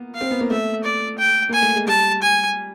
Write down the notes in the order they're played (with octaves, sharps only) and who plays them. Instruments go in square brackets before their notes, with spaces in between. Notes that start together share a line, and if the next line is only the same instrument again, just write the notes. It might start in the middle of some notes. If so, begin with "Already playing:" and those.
Already playing: [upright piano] A#3 B3
[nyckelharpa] F5
[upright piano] C4
B3
A#3
[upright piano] A3 [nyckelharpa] E5
[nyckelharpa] D5
G5
[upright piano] A#3 [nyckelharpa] G#5
[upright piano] A3
G#3
[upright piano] G3 [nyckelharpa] A5
[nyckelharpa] G#5